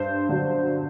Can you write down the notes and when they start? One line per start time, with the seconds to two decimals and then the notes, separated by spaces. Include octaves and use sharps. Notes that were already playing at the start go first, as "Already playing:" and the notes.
Already playing: G2 C5
0.29 D3 F#3